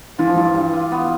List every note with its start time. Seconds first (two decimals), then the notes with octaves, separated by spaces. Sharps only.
0.19 E3 F4
0.27 F3
0.36 G2 E3
0.55 G2
0.73 F4
0.92 B3